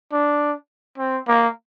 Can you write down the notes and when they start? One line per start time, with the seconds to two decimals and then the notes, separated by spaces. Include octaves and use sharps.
0.12 D4
0.98 C4
1.28 A#3